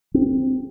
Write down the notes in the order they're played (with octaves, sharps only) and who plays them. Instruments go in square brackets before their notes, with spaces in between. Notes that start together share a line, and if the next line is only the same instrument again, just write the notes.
[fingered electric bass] C4